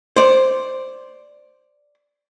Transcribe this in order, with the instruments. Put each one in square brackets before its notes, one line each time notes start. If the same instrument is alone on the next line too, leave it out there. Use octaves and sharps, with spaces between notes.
[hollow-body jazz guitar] C5 D5